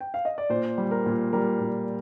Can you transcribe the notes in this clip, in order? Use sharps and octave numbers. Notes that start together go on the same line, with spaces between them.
G5
F5
D#5
D5
A#2 C5
G3
A#4
A#2
G3 A#4
A#2